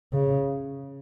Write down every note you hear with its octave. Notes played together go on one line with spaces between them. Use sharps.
C#3